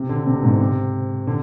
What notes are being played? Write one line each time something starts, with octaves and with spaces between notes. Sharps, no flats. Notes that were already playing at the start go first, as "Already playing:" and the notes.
Already playing: C3
D3
C3
B2
G#2
C3
D3